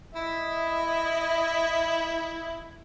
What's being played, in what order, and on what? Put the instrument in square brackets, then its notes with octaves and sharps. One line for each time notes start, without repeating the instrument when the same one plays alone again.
[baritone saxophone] E4 [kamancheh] D#5 E5